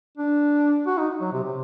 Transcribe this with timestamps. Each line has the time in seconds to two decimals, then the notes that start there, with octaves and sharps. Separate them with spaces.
0.17 D4
0.86 F#4
0.98 D#4
1.21 F#3
1.32 C3
1.44 C3